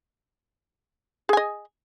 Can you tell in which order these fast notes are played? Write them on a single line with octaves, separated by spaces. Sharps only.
G#4 G#5 D#5